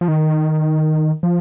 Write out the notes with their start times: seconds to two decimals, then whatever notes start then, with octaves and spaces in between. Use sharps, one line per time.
0.01 F3
0.08 D#3
1.23 F3